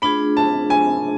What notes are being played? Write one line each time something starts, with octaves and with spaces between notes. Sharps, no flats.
A3 D4 F4 G#4 B5
A5
G#5